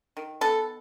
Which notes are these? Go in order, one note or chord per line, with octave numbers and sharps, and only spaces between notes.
D#3
B3 A4